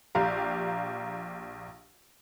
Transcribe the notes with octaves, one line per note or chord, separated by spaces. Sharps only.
A#1 G4 F5 A#5